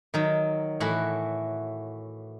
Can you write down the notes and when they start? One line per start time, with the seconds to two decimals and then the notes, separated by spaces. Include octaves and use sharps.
0.14 D#3 F#3
0.80 A2 E3 F#4 B5